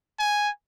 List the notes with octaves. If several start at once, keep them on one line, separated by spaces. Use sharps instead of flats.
G#5